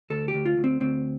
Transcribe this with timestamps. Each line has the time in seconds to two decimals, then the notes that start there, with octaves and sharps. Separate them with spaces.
0.10 D2 A4
0.28 G4
0.34 D2
0.46 F4
0.57 D2
0.64 C4
0.80 D2 C4